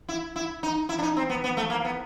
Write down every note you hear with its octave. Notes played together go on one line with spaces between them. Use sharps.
E4
E4
D#4
E4
D4
D#4
C4
B3
B3
A3
A#3
B3